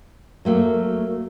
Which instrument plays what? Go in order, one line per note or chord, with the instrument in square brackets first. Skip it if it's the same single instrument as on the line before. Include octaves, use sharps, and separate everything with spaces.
[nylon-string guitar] F#3 A3 A#3